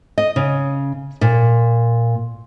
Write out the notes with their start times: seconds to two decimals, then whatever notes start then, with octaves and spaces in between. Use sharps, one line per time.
0.18 D#5
0.36 C#3
1.21 A#2